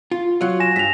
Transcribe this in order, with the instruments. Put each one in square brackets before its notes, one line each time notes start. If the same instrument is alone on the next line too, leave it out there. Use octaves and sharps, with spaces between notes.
[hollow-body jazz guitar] F4
F#3 F4
[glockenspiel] G#5 A#6 E7
[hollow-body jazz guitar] G2 [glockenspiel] B6 F7